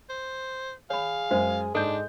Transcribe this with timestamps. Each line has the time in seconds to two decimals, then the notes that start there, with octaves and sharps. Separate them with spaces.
0.09 C5
0.90 G#4 C#5 F5 B5
1.30 F#2 G#3 F#4 C5 G#5
1.75 G#2 G#3 D4 A4 G6